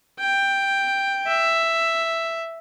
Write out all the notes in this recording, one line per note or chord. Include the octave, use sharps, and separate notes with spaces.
G5
E5